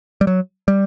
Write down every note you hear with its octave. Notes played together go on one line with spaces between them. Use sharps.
G3
F#3
G3